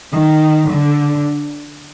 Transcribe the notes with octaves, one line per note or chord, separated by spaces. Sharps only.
D#3
D3